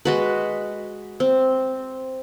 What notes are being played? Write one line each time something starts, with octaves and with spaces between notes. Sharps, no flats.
G#3 F#4 B4
C4